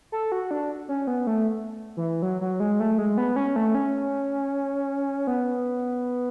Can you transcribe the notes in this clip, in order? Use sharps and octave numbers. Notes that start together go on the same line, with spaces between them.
A4
F#4
D4
C#4
B3
A3
E3
F#3
F#3
G#3
A3
G#3
B3
C#4
A3
C#4
B3